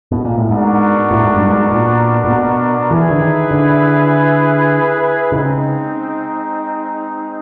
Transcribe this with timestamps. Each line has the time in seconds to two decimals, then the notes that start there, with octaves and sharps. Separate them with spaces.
0.12 B2
0.25 A#2
0.38 A2
0.49 G#2 B3 D4 F#4 A#4
1.11 A2
1.23 G#2
1.36 G2
1.49 G#2
1.71 A#2
2.24 A#2
2.31 B2
2.91 E3 E4 G#4 B4
3.10 D3
3.21 D#3
3.51 D3
5.32 C#3 G#3 C4 D#4